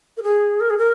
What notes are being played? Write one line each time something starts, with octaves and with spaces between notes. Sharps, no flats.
A#4
G#4
A#4
G#4
A#4